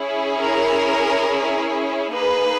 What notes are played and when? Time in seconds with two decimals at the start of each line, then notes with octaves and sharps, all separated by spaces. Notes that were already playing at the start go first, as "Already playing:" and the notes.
Already playing: C#4 E4 G#4
0.39 A#4
2.15 A#3 D#4 G#4 B4